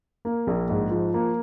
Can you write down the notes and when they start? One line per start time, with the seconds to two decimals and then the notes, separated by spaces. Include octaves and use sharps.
0.25 A#3
0.47 A#1
0.69 G#2
0.91 F3
1.14 A#3